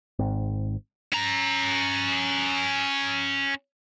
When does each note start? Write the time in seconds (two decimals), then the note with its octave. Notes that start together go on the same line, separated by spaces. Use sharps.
0.19 G#1 G#2 C4
1.13 C#4 A#5